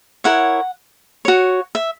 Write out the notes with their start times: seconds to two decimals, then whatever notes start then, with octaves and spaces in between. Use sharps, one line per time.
0.24 E4 A#4 C#5 F#5
1.25 F#4 C#5
1.75 E5